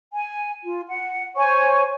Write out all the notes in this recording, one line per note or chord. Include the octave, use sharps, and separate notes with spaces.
G#5
F4
F#5
C5 C#5 G#5 C#6